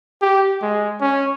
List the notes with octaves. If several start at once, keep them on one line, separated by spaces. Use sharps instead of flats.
G4
G#3
C#4